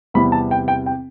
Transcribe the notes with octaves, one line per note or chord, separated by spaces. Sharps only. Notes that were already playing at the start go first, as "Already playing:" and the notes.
E2 C3 G3 B3 E4 B5
A5
G5
G5
G5